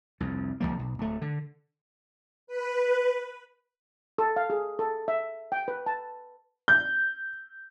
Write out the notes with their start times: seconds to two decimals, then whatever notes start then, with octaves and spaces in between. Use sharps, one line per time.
0.20 C2 F2
0.60 C2 F2 F3 A#3
0.79 B1
0.99 D1 A3
1.21 D3
2.47 B4
4.18 A4
4.36 F5
4.50 G#4
4.79 A4
5.08 E5
5.52 G5
5.68 B4
5.86 A5
6.68 G6